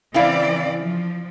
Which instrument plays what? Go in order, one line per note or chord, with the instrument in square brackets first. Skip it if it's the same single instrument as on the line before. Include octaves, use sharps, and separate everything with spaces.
[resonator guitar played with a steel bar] C#3 E4 F5 [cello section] E3 C4 D5
[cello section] F3